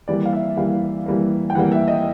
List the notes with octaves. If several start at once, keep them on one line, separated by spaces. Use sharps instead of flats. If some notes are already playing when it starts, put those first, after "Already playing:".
E3 G3 A#3 D5
F5
E5
E3 G3 A#3 F5
E3 G3 A#3
G5
E3 G3 A#3 F#5
E5
D#5